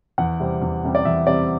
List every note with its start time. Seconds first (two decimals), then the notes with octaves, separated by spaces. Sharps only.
0.18 E2 F#5
0.40 C3 G3 C4
0.62 E2
0.84 C3 G3 C4
0.95 D5
1.05 E2 E5
1.27 C3 G3 C4 D5